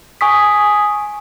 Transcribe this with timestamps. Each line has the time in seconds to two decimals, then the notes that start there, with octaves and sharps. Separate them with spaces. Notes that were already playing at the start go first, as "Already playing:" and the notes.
0.21 G#5 C#6 D#6 B6